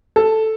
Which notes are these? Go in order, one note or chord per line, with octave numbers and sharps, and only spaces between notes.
A4